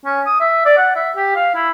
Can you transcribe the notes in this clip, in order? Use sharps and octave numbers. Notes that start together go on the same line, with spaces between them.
C#4
D#6
E5
D5
F#5
E5
G4
F5
E4